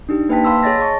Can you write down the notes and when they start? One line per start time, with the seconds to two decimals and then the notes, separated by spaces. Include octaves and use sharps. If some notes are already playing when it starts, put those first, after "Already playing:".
0.09 D4 D#4 G4
0.29 A#3 B4 C5 G5 A5 B6
0.44 F5 A5 B5 C6 E6 B6
0.63 G#4 C#5 D#5 A6 A#6
0.80 D#5 A5 C#6